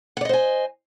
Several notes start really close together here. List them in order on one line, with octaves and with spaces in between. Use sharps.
F#5 D5 D#5 C5 G#5